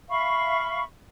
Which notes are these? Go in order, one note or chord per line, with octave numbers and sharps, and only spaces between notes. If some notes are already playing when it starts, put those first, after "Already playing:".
E5 F5 B5 C#6